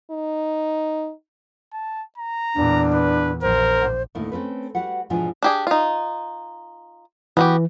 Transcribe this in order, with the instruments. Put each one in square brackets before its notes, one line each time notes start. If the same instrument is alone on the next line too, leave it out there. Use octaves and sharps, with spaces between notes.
[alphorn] D#4
[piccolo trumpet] A5
A#5
[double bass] E2 A#2 [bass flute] D4
[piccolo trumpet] B4
[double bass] A#1 [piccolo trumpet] A#4 [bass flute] C5
[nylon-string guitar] D2 A2 D#3 A3 A#3 E4
A3 C4 C#4 B4
G3 F#4 B4 F#5
G#2 B2 E3 F3 D4 G#5
[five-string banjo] D4 G4 G#4
D#4 F4
[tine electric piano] E3 [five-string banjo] B3 F#4 G4